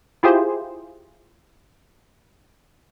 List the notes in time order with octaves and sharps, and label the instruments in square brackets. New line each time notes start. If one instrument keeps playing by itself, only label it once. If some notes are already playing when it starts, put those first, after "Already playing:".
[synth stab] E4 F4 G4 G#4 C5